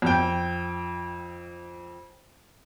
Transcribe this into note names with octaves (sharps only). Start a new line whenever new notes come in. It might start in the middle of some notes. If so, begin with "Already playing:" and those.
F2 G5